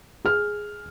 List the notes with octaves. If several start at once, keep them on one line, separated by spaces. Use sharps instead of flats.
G#4 F6